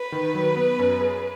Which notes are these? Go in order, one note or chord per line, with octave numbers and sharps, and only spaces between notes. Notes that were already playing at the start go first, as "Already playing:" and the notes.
Already playing: B4
D#3
F#3
B3
F#2
G#4